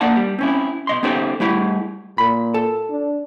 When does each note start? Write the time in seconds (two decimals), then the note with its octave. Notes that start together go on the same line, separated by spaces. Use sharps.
0.01 A#3 D4 D5 F#5 A5
0.16 G3
0.39 C4 C#4 E4
0.87 B2 D#5 C6
1.03 B3 C#4 D#4 G4 A4 C5
1.40 G3 A3 E4 G4 G#4
2.18 A#2 B5
2.54 A4
2.90 D4